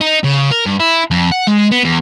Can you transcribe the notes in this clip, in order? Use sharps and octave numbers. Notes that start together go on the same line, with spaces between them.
D#4
C#3
A#4
G2
E4
F2
F#5
G#3
B3
E2